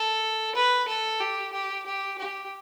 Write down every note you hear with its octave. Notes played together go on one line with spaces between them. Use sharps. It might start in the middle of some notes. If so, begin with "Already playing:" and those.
Already playing: A4
B4
A4
G4
G4
G4
G4